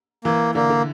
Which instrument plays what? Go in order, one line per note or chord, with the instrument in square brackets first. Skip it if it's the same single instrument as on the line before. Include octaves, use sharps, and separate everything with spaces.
[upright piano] E3 [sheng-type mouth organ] A#3
[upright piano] D3 [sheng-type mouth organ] A#3
[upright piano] D3